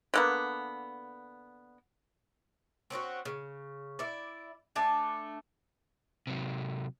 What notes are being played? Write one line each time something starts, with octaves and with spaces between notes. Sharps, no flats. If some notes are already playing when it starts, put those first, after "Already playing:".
D3 A#3 B3
C4 C#4 E4 F#4
C#3
E4 D5
A3 D4 G#5 A5
C3 F#3